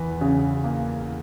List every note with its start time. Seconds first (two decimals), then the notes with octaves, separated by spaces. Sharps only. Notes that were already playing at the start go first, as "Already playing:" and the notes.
Already playing: E2 E3 B4
0.21 C#3
0.64 A#3